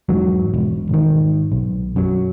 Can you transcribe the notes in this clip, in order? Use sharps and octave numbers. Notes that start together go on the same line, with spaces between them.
E2 G#2 F#3
E1
G#1 D#3
B1
F#2 F#3